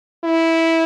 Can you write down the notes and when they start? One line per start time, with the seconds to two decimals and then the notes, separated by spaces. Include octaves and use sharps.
0.24 E4